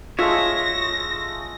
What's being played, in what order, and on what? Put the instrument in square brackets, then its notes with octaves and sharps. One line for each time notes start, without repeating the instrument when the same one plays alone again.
[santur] G#3 A3 [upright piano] F4 [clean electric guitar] C#5 E5 [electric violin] A#6